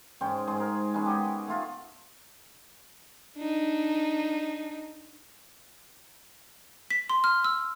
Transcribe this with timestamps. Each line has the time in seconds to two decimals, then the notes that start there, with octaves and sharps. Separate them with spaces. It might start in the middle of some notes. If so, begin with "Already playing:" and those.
0.21 G#2 C#4 C5 G5
0.47 G#2 G#4 C5
0.60 A#4
0.94 G#3 B3 C#4 D#4
1.06 G4 G#4 D#5 F#5
1.48 A3 F4
3.37 D4 D#4
6.90 B6
7.10 C6
7.24 F6
7.44 E6